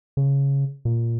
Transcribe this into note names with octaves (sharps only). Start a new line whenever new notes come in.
C#3
A#2